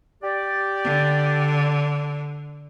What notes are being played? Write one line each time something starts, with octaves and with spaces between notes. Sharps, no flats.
G4 D5
D3